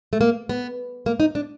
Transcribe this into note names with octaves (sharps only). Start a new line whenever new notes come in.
A3
A#3
B3
A#3
D#4
D4